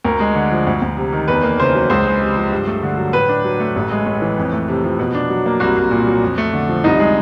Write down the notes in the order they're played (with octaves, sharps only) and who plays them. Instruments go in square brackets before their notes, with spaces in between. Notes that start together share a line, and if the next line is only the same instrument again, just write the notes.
[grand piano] D2 [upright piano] A#4
[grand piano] G#3
D3
F3
D2
D2
C3
D#3
[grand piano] E2 [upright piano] B4
[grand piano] A#3
[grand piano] C#3 [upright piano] C5
[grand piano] F#3
[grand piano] C#2 [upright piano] C5
[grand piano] G#3
C3
F3
G2
A3
D3
F#3
[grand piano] A2 [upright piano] B4
[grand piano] D4
F#3
A3
A1
G#3
A2
E3
F2
A3
C3
F3
B2
D4
F#3
A#3
[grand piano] C2 [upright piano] F#4
[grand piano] C2
A#2
F#3
F2
A3
D3
F3
[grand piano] C2 [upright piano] D#4
[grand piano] G#3